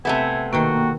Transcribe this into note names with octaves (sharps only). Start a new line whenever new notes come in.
C3 A3 B3 G#5
B2 D#3 A#3 F#4 G5